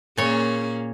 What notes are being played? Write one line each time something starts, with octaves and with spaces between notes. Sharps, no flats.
A#2 A#3 C#4 G#4 C#5